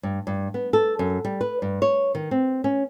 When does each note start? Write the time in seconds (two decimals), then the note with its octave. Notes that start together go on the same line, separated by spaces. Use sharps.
0.03 G2
0.27 G2
0.54 B3
0.73 A4
0.99 F#2
1.25 G3
1.41 B4
1.62 G2
1.82 C#5
2.15 D#3
2.31 C4
2.64 C#4